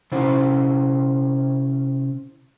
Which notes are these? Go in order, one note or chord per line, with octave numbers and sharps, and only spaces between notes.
C3 C#4 E4 C5